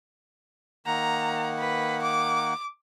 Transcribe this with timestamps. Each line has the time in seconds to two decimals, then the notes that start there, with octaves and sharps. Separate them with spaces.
0.87 D#3 A#3 F#5 A#5
1.58 B4
2.02 D6